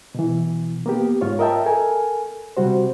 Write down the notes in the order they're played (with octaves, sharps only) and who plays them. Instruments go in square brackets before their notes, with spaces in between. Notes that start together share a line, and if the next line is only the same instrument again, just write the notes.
[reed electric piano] B2 E3
A#3 B3 G4
G#2 F4 C#5
A#4 D#5 E5 G5 A5
A4 A#4 G#5
C3 G3 F#4 C5